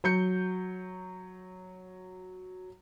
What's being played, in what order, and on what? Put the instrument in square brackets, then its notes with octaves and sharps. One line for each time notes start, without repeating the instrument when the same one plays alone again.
[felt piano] F#3 G6 C#7